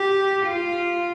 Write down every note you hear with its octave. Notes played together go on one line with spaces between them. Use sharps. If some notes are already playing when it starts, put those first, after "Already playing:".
Already playing: G4
F4